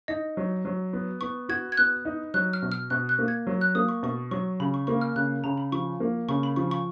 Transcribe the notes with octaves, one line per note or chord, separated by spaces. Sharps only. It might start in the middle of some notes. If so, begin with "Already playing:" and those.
D#4 D#5
F#3
F#3
B3
B3 C#6
F#4 G#6
G#6
B3 F#6
D#4
F#3 F#6
F6
B2
F6
B2 F#6
F#6
A#3
G#6
F#3
F#6
A#3 D#6
C#6
B2 C#6
F#3 C#6
C#3 B5
C#6
A#3 C#6
F6
C#3 F#6
C#3 A#5
B5
F3 C#6
A#3
C#3 C#6
B5
F3 C#6
C#6